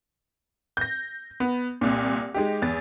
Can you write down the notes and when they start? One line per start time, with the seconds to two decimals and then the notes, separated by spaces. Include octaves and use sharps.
0.77 G6 A#6
1.40 B3
1.81 C2 A#2
2.34 G#3 D#4 G4
2.62 E2 A6